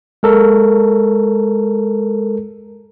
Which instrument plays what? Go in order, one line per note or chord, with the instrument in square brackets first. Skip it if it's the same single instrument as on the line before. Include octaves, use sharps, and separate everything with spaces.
[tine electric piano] G#3 A4 A#4